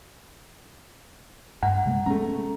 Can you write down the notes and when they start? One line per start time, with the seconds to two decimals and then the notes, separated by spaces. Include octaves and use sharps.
1.63 G2 F#5 A#5
1.85 C3 G#3 A#3
2.06 G#3 A3 B3 C#4 A#5